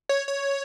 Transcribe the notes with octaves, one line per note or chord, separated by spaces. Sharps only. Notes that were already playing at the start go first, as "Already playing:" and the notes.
C#5
C#5